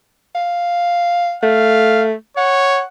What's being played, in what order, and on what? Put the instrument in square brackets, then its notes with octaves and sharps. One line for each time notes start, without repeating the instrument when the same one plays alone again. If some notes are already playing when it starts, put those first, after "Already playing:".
[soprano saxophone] F5
[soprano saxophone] A3 [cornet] F5
[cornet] C#5 [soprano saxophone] F#5